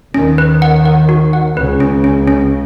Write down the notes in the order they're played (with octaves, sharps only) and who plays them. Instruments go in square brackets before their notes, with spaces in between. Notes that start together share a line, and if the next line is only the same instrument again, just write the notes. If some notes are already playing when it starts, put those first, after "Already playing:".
[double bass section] D#2 D#3 [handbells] C#4
[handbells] B4
F#5
F#5
F#4
F#5
[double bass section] C#2 C#3 [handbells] B4
[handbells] C#4
C#4
C#4